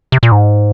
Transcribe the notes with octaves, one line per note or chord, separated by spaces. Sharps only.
C3
A#2
G#2